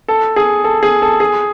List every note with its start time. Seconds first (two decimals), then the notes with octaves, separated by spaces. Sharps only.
0.08 A4
0.36 G#4
0.64 A4
0.83 G#4
1.02 A4
1.20 G#4